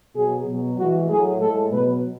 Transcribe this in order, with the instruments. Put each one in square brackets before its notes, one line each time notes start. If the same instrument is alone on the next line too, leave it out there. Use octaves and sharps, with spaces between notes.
[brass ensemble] B2 F#3 G#4
B2 F#3
A2 E3 G#3 F#4
A2 F#3 G#4
A2 G#3 A4
B2 F#3 B4